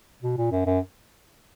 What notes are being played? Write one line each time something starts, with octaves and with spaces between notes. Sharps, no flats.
B2
A#2
F#2
F#2